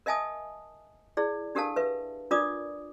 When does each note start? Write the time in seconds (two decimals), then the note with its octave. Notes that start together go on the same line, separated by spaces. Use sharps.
0.06 A#4 D#5 E5 G#5 A5 D#6
1.17 E4 G#4 D5
1.55 D4 G4 A4 A#4 F5 A5
1.76 B4 E5
2.31 D4 F4 A#4 D5 D6 D#6